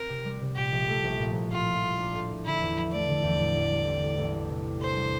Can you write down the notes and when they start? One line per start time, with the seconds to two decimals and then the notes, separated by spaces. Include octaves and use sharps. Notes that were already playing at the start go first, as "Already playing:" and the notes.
Already playing: C4 A#4
0.09 C3
0.25 G3
0.41 C3
0.56 A#2 G4
0.72 A#1
0.88 A3
1.04 A#1
1.20 A#2
1.35 A#1
1.51 A2 F4
1.66 A#1
1.82 G3
1.98 D4
2.14 A2
2.29 A#1
2.45 D3 E4
2.61 E2
2.76 F3
2.92 A3 D5
3.08 D3
3.23 E2
3.39 A2
3.56 A1
3.71 G3
3.87 C4
4.02 A2
4.18 A1
4.34 G3
4.50 C3
4.65 D4
4.81 A4 C5
4.97 G3